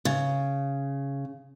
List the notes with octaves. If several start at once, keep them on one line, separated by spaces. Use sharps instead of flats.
C#3